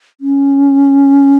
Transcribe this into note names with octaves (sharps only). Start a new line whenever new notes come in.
C#4